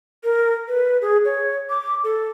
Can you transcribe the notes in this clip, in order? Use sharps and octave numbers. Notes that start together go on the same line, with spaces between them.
A#4
B4
G#4
C#5
D6
A4